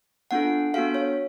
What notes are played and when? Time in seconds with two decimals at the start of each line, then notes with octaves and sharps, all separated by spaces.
0.31 B3 D4 F4 A4 F#5
0.74 B3 D4 F#4 A4 F5
0.94 C#5